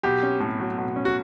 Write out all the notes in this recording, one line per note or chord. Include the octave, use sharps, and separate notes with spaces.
B1 G4
C#4
A2
F#3
B1
C#4
F#4